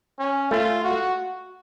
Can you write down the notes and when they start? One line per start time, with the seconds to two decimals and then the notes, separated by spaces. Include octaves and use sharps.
0.19 C#4
0.51 A3 F4
0.84 F#4